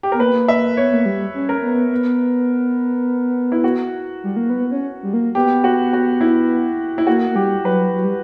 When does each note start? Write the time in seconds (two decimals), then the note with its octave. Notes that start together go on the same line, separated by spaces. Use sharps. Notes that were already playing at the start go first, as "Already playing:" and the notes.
0.03 G4
0.12 B3 A#4
0.20 A#3 B4
0.48 E5
0.77 B3 C#5
0.94 A#3
1.06 G3
1.35 C#4
1.49 A#4
1.63 B3
1.91 B3
3.52 E4
3.64 F#4
4.24 G3
4.36 A#3
4.49 B3
4.71 C#4
5.03 G3
5.13 A#3
5.35 B3 G4
5.64 F#4
5.93 F#4
6.21 E4
6.98 E4
7.07 A#3 F#4
7.30 A#3
7.36 G3 G4
7.64 F#3 B4
7.93 F#3
8.04 G3